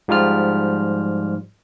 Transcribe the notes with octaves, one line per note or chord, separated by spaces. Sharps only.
G#2 F3 G3 F4 F6